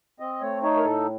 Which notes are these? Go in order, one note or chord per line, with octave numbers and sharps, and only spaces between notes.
C4 D#5
A3 C#5
D#4 C#5
A#4
A2 A4